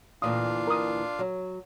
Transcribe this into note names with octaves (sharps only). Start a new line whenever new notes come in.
D2 A#2 E3 D4 F4 F5 D#6
A#4 D#6
F#3